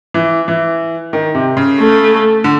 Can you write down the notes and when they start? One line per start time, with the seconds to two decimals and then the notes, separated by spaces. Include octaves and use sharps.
0.14 E3
0.48 E3
1.13 D#3
1.35 C3
1.57 C#3
1.78 A3
2.44 D3